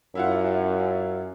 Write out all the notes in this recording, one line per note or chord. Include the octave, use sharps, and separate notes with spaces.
F#2 E4 F4 F#5